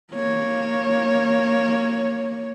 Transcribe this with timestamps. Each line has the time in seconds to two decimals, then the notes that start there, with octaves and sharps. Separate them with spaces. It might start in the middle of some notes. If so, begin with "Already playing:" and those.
0.12 A#3 C#5